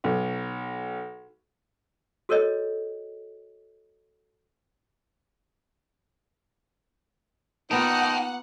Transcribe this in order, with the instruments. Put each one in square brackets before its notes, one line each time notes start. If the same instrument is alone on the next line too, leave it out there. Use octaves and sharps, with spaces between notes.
[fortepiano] B1
[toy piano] F#4 A4 A#4 C#5 D#5
[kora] A#3 B3 F4 [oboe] D#4 [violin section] F#5 [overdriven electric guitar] G5 A5